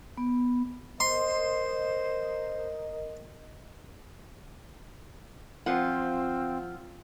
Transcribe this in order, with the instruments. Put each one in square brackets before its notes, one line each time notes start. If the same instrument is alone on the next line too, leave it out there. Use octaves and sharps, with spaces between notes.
[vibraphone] B3
[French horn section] A#4 D#5 [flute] C5 [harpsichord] C6
[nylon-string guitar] F3 F4 F#5 [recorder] C4